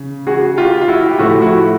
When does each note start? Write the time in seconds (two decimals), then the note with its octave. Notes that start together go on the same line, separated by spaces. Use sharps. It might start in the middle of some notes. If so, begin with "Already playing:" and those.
Already playing: C#3
0.27 F#4 G#4
0.57 F4 G4
0.81 F4
0.88 E4 F#4
1.08 G4
1.18 A2 F3 A3 E4 F#4
1.42 E4 F#4